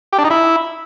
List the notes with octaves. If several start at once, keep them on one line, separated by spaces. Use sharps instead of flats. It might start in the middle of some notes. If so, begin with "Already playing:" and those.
G4
D4
D#4
E4